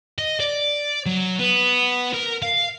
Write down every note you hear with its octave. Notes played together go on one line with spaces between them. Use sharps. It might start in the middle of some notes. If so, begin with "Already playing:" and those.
D#5
D5
F#3
B3
A#4
F5